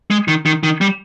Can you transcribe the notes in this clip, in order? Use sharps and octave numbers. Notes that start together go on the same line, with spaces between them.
G#3
D#3
D#3
D#3
G3